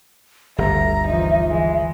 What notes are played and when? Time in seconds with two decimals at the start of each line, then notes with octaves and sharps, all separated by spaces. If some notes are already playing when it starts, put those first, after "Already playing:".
0.58 G1 D2 E5 A#5
1.07 E3 F3 D#4
1.48 E3 G#3